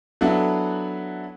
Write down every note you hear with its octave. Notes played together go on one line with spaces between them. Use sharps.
F#3 B3 D4 E4 F#4 A4